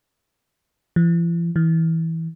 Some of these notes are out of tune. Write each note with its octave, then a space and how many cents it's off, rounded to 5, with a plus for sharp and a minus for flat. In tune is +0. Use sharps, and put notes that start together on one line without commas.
E3 +45
E3 -20